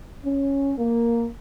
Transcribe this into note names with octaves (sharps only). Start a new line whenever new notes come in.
C#4
A#3